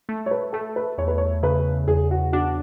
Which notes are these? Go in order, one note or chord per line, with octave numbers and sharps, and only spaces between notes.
A3
C#5
B4
A3 A4
B4
E2 C#5
B4
C#5
C#3 B4
E2 G#4
F#4
D4 F#4